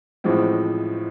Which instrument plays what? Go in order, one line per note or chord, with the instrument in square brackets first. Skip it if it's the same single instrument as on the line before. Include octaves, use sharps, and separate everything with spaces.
[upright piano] A1 A2 F3 G#3 C4